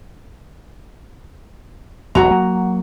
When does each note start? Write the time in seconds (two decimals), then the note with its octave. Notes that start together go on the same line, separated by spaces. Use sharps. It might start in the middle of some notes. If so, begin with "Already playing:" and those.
2.15 E1 B1 E2 F#4 A#5
2.31 F#3 A#3